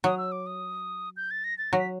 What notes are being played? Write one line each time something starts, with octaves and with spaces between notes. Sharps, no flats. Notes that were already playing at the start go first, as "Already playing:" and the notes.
F#3 D#6
E6
D6
D#6
G6
A6
A#6
A6
F#3 A#6
B6